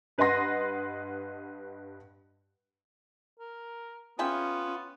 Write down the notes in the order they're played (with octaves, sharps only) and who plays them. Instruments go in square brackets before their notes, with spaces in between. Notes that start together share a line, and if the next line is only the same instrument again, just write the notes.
[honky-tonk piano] G2 B4 D#5 F#5 C6 A#6
[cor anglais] A#4
[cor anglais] B3 [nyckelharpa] C#4 [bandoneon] F4 [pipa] G#4 E5 G5